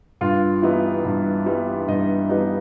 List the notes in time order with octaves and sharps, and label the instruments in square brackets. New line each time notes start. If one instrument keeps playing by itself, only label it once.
[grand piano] G2 F4 F5
E3 G3 B3 D#4
G2
E3 G3 B3 D#4
G2 D#4 D#5
E3 G3 B3 D#4